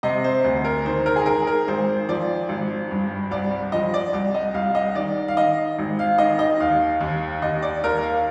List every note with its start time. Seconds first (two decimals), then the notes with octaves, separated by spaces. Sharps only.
0.03 C3 D#5
0.24 C5
0.44 D2
0.64 A#4
0.85 D#3 C5
1.06 A#4
1.16 G#4
1.26 D#3 A#4
1.41 G#4
1.47 A#4
1.68 G#1 C5
2.09 F3 D5
2.49 G#1
2.91 G2
3.31 C2 D5
3.72 F3 D#5
3.94 D5
4.13 C2 D5
4.34 D#5
4.54 C2 F5
4.75 D#5
4.95 D#3 D5
5.28 F5
5.37 D#3 D#5
5.79 G#1
5.99 F5
6.18 D#3 D#5
6.39 D#5
6.60 D#2 F5
7.00 D#2
7.42 D#2 D#5
7.62 D5
7.83 D#2 A#4
8.03 F5